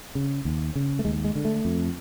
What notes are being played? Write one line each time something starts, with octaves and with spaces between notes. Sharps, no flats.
C#3
D#2
C#3
A3
D#2 G#3
G#3
D3
A3
F2